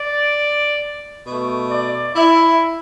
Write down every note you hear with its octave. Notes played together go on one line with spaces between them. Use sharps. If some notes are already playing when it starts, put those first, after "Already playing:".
Already playing: D5
B2 A3
D5
E4